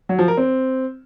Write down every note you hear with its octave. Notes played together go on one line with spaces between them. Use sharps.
F#3
F3
A#4
C4